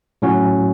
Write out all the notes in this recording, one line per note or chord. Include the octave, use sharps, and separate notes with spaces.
A2 F#3 C#4 F#4